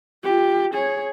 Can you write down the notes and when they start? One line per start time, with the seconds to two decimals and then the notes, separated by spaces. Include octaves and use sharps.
0.24 F4 G4
0.74 G#4 C#5